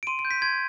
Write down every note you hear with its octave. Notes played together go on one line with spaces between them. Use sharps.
D7
C6 D#7
D7
G6
B6
C6 G#6